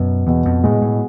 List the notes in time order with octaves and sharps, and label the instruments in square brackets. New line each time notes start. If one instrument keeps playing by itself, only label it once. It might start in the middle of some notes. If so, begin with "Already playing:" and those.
Already playing: [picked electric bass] F#2 [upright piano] B2 B3
[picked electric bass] E2 [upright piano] B2
[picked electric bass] F2
[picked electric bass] A2 [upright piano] G#3
[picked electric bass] A2